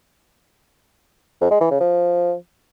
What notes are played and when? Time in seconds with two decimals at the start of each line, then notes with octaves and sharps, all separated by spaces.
1.41 F2
1.51 G#3
1.61 E3
1.71 C#3
1.80 F3